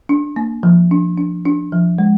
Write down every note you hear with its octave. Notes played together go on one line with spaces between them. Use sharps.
D4
A#3
F3
D4
D4
D4
F3
G#3